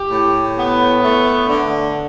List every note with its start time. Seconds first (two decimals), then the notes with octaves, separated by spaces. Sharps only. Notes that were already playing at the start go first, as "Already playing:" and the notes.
Already playing: G4
0.11 A2
0.58 B3
1.03 A3
1.49 D3